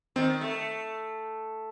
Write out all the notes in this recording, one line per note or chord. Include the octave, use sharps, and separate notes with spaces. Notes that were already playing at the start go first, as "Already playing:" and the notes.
D#3 C4
A3